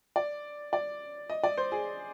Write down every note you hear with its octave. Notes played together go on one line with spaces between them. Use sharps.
D5
D5
D#5
D5
C5
G#4